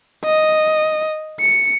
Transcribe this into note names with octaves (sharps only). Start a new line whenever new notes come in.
D#5
C#7